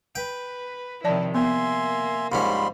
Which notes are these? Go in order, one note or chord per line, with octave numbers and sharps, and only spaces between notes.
B4 G5
C3 D#3 F3 E4 D5 A5
A#3 B3 E5 G#5 C6
A#1 G#2 G3 C#4 B5 C6